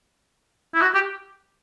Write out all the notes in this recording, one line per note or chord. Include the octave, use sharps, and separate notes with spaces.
E4
F#4
G4